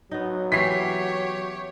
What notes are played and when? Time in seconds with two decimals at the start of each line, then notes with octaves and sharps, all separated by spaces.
0.11 F#3 B3 D#4
0.52 E3 C#4 G4 C#5 B6 C7